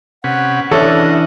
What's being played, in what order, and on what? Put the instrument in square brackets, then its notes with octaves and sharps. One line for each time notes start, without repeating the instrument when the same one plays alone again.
[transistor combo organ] C3 C#4 B4 [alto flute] F#5
[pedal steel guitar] E3 C#4 D4 [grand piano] A4 C#5 [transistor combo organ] D#5 F#5 [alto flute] E5